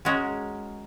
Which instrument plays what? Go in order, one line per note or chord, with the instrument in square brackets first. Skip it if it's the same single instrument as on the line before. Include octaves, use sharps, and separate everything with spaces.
[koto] G#3 C#4 F#4 A#4